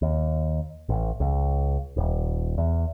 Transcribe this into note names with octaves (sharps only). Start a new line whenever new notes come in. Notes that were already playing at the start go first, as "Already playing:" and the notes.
D#2
A1
C#2
D#1
E2